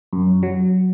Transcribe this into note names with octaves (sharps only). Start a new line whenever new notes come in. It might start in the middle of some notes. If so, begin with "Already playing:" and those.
F#2
F#3